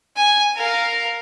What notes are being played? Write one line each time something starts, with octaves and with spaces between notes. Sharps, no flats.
G#5
A#4 F5